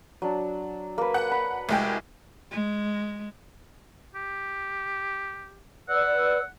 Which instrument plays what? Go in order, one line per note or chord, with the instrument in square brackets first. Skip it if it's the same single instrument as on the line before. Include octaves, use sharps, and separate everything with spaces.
[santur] F#3 D4
A#3 B4
[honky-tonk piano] F#5 F#6
[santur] B5
[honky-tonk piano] C2 G#3 G5
[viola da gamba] G#3
[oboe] G4
[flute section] B4 D5 E6 [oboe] F#5